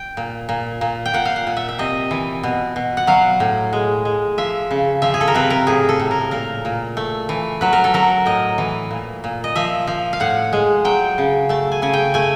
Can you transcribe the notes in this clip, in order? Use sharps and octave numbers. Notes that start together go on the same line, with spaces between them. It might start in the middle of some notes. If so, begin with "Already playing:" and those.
Already playing: G5
A#2
A#2
A#2
G5
A#2 F#5
F5
F#5
A#2
E5
E5
C3 D#5
E3
B2
B2
F#5
F#3 F5
A2
G#3
G#3
F3 E5
C#3
F3 E5
G#4
A4
A#4
C3 B4
A#4
A2 G#4
A4
A2
A#4
A#2 A#4
A#2
A3
E3
F#3 B4
A#4
A4
F#3 A#4
A2 D#5
E3
A#2
A#2
D#5
F3 E5
F3
F5
A2 F#5
G#3
F#3 G5
C#3
A3 A5
G#5
C#3 G#5
G5
A3 G#5